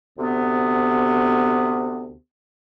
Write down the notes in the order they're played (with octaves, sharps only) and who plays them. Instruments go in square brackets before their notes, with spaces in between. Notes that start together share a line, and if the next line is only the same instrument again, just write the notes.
[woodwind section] D2 C3 B3